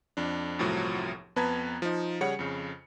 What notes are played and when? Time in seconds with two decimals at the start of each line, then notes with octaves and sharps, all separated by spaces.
0.17 F2 D4
0.59 G1 C2 A2 F3 F#3
1.36 F2 B3 B4 A5 A#5 G#6
1.82 F3 D#4
2.21 C#3 G3 G#4 C#5 F#5 C#7
2.39 F2 C#3